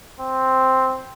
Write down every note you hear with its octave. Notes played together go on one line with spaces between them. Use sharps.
C4